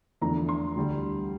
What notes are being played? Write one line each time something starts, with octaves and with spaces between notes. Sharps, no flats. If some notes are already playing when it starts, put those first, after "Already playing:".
E2 D3 F3 A3 D4 A#5
C6
D2 D3 G3